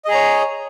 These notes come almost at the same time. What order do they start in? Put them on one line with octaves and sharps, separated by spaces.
D#5 G#4 A#5 C#5